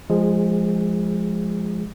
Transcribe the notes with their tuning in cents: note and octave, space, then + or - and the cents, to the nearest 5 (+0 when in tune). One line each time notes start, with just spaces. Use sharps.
F3 +0 G#3 +0 G#4 -30